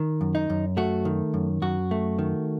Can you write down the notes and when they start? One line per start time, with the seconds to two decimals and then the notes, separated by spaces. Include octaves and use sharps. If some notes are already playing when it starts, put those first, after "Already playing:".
Already playing: D#3
0.21 F#2
0.35 D#4
0.50 F#2
0.77 A3 F#4
1.05 D#3
1.34 F#2
1.62 F#2 F#4
1.91 A3
2.19 D#3